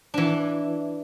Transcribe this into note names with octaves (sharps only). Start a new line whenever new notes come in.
E3 D4